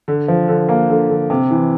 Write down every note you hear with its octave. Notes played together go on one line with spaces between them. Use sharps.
D3
F3
D3
A#3
D3
D3
C3
E3